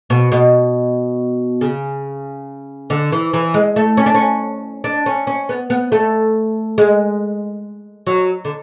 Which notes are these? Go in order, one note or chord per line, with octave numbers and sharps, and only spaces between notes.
B2
B2
C#3
D3
E3
E3
G#3
A3
C#4
D4
C#4
D4
C#4
C#4
B3
B3
A3
G#3
F#3
D3